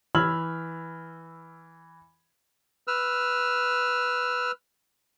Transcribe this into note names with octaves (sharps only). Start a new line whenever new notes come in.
E3 B5 E6 F6 G#6 F#7
B4 E6 F6